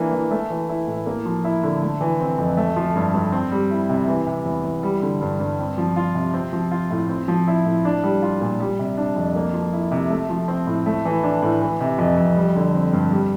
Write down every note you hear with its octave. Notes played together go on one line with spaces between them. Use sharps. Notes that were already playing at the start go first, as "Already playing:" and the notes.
Already playing: E3 A#3 D4
E3
A3
E3
E4
A2
A#3
F3
E4
D3
A3
E3
C4
F2
A3
F3
G2
G2
C4
G3
E4
C3
E3
C3
E2
E2
G3
D3
G2
G2
C4
F3
F4
C3
C4
F3
F4
A2
C4
F3
E4
A2
D4
G3
F4
A#2
G3
C3
D4
F2
A#3
F3
E4
C3
A3
F3
C4
A2
A3
E3
D4
A2
E3
C3
F2
F2
G3
D3
C4
G2
G3